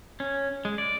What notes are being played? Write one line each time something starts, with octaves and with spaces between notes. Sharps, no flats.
C#4
G#3
D5